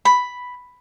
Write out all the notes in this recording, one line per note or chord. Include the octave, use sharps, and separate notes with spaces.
B5